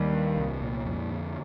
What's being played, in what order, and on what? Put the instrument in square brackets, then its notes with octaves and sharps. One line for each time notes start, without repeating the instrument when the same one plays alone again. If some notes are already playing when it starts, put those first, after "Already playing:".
Already playing: [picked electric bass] D#2 D#3 [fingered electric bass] G3
[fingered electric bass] D4
C2
A#2
F2
D3